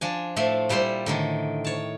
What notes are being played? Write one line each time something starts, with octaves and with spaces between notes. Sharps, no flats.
F3 D4 G#5
A2 F3 A3 E5 C6
A#2 G3 E4 C5 C6
A2 D3 D#3
C#5 A5